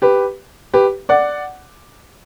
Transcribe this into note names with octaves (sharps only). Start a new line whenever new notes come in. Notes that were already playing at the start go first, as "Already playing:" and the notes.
G4 B4
G4 B4
D5 F#5